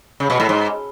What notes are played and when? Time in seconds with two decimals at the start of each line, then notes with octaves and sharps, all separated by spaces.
0.20 C#3
0.30 B2
0.40 A2
0.49 G#2